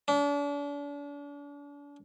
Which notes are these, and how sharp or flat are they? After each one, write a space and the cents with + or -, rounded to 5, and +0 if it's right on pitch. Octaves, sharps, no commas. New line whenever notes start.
D4 -40